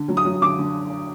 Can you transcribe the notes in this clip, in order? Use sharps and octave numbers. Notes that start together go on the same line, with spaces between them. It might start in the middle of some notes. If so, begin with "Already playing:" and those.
Already playing: D3
F#3
D#6
F#3
D3 D6
D3